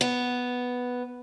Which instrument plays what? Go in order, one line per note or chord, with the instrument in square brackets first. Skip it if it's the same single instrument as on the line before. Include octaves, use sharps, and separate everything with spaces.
[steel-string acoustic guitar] B3